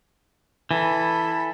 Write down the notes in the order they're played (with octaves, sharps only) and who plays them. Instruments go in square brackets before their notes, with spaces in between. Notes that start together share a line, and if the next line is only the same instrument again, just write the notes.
[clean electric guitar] E3 [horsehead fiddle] A4 B5